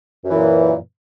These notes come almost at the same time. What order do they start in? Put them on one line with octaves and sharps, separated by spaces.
F#2 E3 A#2